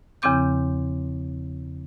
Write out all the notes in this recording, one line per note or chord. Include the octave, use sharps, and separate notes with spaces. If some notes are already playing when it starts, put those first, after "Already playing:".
E2 C#3 F3 C4 D6 G6